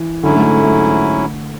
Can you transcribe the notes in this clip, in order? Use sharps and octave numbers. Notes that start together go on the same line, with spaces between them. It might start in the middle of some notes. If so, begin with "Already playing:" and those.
Already playing: E3
G#2 D3 F#3 C#4 E4
A3
A3